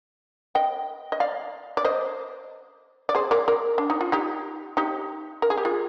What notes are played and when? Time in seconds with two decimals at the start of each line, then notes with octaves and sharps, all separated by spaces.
0.55 D#5 G5
1.12 D#5
1.20 D5 F5
1.77 D5
1.85 C5 D#5
3.09 D5
3.15 G#4 C5
3.31 A#4 D5
3.48 A#4 D5
3.78 D4
3.90 D#4
4.01 F4
4.12 D#4 G4
4.77 D#4 G4
5.42 A#4
5.50 G#4
5.58 G4
5.65 F4 G#4